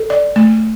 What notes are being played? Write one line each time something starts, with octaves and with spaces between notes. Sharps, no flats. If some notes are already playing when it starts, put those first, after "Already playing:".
Already playing: A4
D5
A3